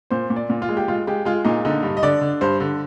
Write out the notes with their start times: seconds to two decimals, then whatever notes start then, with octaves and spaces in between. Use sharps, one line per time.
0.10 A#2 C5
0.30 A#2
0.36 D5
0.50 A#2
0.62 F4
0.69 G#3
0.77 G4
0.88 G#3 F4
1.07 G#3 G4
1.25 G#3 F4
1.45 A#2 D#4
1.65 D3 D#4
1.83 G2
1.97 D#5
2.03 D3 D5
2.21 D3
2.41 G2 C5
2.60 D3